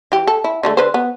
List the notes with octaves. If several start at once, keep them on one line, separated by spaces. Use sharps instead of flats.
E3 G4
A4
E4
D3 G#3 A3
D3 B4 C5
B3